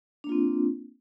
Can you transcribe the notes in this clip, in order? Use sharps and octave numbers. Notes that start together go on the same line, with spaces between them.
A#3 C4 D4 F4